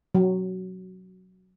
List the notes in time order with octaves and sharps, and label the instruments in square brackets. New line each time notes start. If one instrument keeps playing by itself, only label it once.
[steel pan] F#3